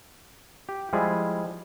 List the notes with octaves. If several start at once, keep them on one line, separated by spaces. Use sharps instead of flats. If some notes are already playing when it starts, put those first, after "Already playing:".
G4
F3 G3 G#3 E4 G#4